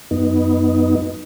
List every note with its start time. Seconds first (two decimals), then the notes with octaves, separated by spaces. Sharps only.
0.11 F#2 B3 D#4